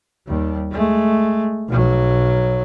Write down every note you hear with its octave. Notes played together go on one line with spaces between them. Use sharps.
D#2 G3
G#3 A3
B1 F#3